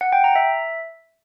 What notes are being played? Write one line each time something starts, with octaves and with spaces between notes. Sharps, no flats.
F#5
G5
A#5
E5